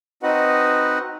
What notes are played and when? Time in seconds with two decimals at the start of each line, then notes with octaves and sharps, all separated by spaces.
0.23 C4 D#4 F#4 B4 D#5 F#5